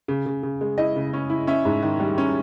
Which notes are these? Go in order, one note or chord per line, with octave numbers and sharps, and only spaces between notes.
C#3
C#3
C#3
G#3
E4 D#5
C#3
C#4
E4
C#4 E5
G#2
D#3
G3
C#4